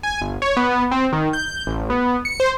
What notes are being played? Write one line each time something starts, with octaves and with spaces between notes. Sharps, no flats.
G#5
G1
C#5
B3
C4
D#3
G6
A1
B3
C#7
C5